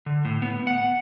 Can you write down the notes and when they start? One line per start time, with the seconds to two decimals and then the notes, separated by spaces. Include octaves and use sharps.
0.06 D3
0.25 A2
0.42 B3
0.67 F#5